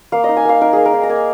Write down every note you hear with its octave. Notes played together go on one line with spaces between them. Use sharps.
A#3 F5
D#4 D#5
G#5
A#3 F5
D#4 A#4
A#3 G#4
A#4
D#4
A#5
A#3 G#5